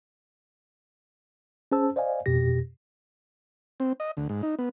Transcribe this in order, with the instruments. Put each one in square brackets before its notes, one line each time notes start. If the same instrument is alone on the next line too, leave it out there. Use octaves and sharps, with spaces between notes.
[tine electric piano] C#4 G#4 C5 A5 E6
C5 D5 D#5 F5 G#5
F2 B2 G4 A#6
[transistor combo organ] C4
D#5
D2
G#2
D#4
B3